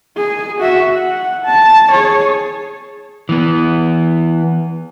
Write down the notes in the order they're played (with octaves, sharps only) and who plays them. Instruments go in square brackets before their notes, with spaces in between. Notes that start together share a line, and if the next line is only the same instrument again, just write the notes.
[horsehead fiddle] G#4
F#4 E5
F#5
A5
G#4 C#5
[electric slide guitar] E3 B3